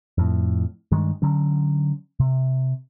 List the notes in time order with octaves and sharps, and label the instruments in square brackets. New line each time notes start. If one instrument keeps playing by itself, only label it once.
[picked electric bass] F2 A2
G2 D#3 G#3
D3 F#3 C#4
C3